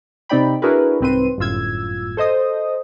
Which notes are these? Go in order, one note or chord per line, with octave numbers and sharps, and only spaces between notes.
C3 C4 D#4 D5 G5 B5
D4 E4 F#4 G#4 A#4 B4
C2 G#2 C4 B4 C6 D#7
G1 F#2 A2 F4 E6 G#6
A4 C5 D#5 D#6